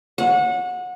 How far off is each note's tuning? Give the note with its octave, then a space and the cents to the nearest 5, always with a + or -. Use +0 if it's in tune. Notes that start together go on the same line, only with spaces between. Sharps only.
F#5 -25